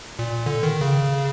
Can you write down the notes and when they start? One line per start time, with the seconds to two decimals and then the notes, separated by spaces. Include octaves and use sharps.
0.19 A#2
0.46 D3
0.63 D#3
0.81 C#3